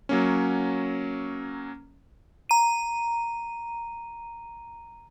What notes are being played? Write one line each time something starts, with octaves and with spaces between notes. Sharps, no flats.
F#3 A#3 C#4
A#5 D#7